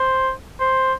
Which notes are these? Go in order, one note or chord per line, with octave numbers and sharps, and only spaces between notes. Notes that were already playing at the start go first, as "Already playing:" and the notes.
Already playing: C5
C5